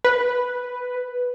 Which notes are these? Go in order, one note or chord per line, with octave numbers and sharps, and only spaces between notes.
B4